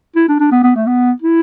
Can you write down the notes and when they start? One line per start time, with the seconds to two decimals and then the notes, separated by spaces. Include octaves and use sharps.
0.16 E4
0.28 D4
0.40 D4
0.52 B3
0.63 B3
0.76 A3
0.87 B3
1.22 E4